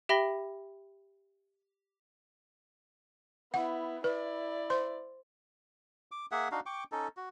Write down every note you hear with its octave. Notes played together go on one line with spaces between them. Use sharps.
G4 E5 G5 B5 A#6 G7
B3 E4 F#5
E4 B4 D5
C5 C6
D6
A#3 G#4 E5 F#5
D4 D#4 F#4 F5
G5 C#6 D6
C#4 D#4 A4
F#4